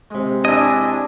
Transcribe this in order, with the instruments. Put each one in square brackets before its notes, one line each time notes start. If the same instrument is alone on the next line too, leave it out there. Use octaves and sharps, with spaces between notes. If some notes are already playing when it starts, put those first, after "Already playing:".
[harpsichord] C3 G#3
[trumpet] D4 [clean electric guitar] E4 D#5 [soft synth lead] G#5